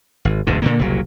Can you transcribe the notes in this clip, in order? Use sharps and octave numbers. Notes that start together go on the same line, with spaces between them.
G#1
E1 D2 G#2 D3
A#2 D3 A#3
F#1 C2 A#2 F#3